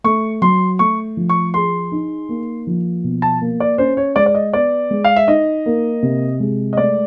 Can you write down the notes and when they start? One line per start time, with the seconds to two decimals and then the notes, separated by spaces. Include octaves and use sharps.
0.04 A3 C#6
0.42 F#3 C6
0.79 A3 C#6
1.17 F3
1.30 C#6
1.54 G#4 C6
1.92 D#4
2.29 A#3
2.67 F3
3.04 B2
3.22 A5
3.41 A#3
3.60 D5
3.78 C#4 C5
3.97 C#5
4.16 G#3 D5
4.26 D5
4.35 D#5
4.53 B3 D5
4.91 G#3
5.04 F5
5.16 E5
5.28 D#4 D#5
5.66 A#3
6.02 C3
6.40 G#3
6.73 D#5
6.77 A3 D5